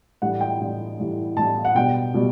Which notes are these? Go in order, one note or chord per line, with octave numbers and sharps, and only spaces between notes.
A2 E3 G3 D4 F#5
G5
A2 E3 G3 D4
A2 E3 G3 D4
A2 E3 G3 D4 A5
F#5
B2 G3 B3 D4 G5
B2 G3